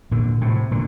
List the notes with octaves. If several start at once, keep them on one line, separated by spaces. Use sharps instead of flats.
A#2 D3
A2 C3
A#2 D3